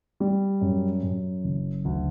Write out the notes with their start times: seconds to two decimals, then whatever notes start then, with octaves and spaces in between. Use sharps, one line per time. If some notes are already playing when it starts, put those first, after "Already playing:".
0.20 G3
0.61 F#2
1.03 F#2
1.44 F#1
1.85 D2